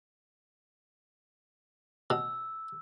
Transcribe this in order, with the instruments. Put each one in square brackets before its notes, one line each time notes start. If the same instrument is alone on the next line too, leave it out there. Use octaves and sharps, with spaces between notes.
[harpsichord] B2 [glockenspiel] E6